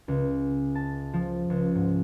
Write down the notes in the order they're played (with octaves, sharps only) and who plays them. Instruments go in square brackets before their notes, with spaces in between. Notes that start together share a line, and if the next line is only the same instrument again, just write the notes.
[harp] C#2
A5
F3
C#2
G#2